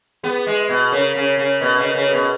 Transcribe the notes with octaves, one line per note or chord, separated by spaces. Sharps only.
B3 G#4 B4
G#3
B2
C#3 A#4 C#5
C#3
C#3
B2 B4 D#5
C#3
A#4 C#5
C#3
G#4 B4
B2